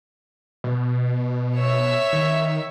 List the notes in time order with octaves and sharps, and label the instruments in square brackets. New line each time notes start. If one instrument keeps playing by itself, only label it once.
[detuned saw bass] B2
[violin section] C#5 E5 E6
[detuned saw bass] D#3